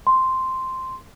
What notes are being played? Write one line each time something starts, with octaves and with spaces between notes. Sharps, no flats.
C6